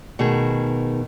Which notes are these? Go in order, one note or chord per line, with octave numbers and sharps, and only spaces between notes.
B2 D#3 A3 G#4